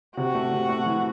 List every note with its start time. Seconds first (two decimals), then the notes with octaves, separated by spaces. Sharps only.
0.16 C3 F#4
0.35 A3
0.52 C3
0.69 A3
0.86 E3